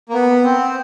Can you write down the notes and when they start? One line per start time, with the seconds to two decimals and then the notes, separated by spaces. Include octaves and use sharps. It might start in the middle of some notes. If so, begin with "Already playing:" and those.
0.09 A#3
0.14 B3
0.44 C4